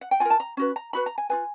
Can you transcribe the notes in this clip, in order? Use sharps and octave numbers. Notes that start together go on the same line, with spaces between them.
F#5
G5
F4 A#4 G#5
A5
A#5
C#4 F#4 B4
A#5
D#4 F#4 B4 B5
A#5
G#5
F4 G#4 B4 G#5